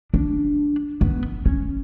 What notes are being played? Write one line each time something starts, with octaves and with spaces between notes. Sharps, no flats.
D4
B3
C#4